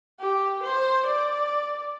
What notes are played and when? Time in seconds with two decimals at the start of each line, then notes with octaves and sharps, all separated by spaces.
0.19 G4
0.62 C5
1.05 D5